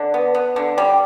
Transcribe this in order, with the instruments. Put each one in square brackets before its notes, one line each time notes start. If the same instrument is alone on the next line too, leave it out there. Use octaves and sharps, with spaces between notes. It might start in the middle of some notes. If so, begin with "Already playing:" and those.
Already playing: [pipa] D3 D4
B3
B3
D3
G3